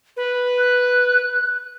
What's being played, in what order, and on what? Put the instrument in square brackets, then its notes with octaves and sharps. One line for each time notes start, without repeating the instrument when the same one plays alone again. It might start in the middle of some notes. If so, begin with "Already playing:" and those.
[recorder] B4
[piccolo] F#6